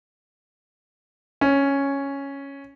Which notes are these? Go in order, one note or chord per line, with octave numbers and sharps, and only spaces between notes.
C#4